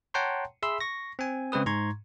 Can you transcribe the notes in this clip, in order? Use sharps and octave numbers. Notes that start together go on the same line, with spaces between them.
C#5 F#5 G5 A5 A#5 C6
G#4 E5 B5 C6 E6
C#6 A#6
C4 G#5
C#3 G#3 C4 B4 D#6
G#2 A#5 C6 C#6 G#6